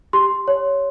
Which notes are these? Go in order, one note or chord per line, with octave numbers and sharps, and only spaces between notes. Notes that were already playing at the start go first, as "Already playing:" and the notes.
G4 C6
C#5